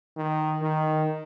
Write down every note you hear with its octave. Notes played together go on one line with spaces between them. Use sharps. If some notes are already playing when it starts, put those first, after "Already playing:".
D#3
D#3